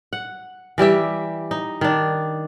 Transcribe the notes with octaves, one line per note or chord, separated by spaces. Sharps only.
F#5
E3 G3 G4 E5
D#4
D#3 D4